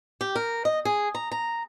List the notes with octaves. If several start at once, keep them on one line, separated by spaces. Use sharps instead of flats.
G4
A#4
D#5
G#4
A#5
A#5